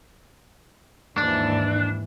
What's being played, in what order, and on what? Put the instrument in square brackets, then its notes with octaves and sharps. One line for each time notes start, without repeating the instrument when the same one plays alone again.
[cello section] D#2 G#2 E3 [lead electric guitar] D4